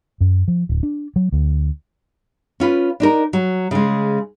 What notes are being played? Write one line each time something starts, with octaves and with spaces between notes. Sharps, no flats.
F#2
F3
D1
D4
F#3
D2
C#4 F4 B4
D4 D#4 A#4
F#3
C#3 G#3